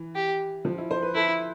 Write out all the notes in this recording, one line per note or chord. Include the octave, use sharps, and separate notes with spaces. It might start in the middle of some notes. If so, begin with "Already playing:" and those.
Already playing: E3
G4
F3
E4
C5
B4
E4 A4